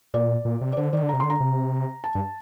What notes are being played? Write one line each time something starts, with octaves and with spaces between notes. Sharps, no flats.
A#2 D5
A#2
C3
D5
D3 C5
D#3 D5
D3
C3 A#5
D3 C6
A#5
C3
A5
G2